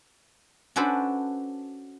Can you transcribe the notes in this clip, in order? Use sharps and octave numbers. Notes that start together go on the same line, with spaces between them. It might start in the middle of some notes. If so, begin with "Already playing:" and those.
C#4 D4 F#4 A4 B4 C5